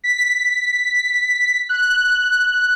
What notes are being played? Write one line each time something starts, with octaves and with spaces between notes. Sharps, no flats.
B6
F#6